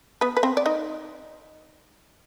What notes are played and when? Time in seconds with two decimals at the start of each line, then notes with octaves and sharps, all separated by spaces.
0.21 B3 B4
0.37 B4
0.43 C4 C5
0.57 D5
0.66 D#4 D#5